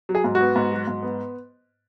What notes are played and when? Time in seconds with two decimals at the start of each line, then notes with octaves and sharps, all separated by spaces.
0.09 F#3
0.15 G#4
0.24 G#2
0.35 F#4
0.40 B3
0.56 G#2
0.72 F#3
0.87 G#2
1.02 B3